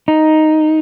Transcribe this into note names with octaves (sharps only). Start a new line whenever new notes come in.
D#4